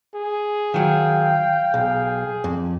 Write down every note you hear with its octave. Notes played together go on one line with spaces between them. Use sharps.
G#4
D#3 F#3 F5 G5
B1 G#4
F2